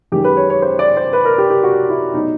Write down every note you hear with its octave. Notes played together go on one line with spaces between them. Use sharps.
F#2 D#3 G#3 G4
B4
C#5
C#5
C5
D5
C5
B4
A#4
G4
G4
F#4
E4
B2 F#3 A3 D#4